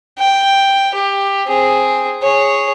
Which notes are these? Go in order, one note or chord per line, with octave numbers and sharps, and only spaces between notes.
G5
G4
C4 G#4
G#4 C#5